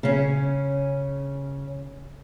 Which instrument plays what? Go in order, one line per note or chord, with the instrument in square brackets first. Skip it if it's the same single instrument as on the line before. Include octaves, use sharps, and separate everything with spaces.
[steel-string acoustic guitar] C#3 C#4